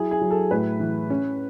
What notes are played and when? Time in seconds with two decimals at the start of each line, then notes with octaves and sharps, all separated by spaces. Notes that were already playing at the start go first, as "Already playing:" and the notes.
Already playing: F#3 E4 G#4
0.11 G#4
0.21 F#3
0.31 A4
0.51 A2 B4
0.80 E3
1.10 C#4